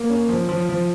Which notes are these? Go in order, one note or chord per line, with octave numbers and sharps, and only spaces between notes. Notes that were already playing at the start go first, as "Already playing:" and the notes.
Already playing: A#3
C#4
F3
F3
F3